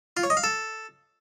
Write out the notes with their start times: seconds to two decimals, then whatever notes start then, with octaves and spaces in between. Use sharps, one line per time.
0.17 F4
0.23 C#5
0.30 D#5
0.37 F5
0.44 A4